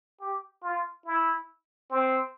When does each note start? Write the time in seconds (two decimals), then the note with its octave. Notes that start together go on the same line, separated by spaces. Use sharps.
0.21 G4
0.63 F4
1.05 E4
1.90 C4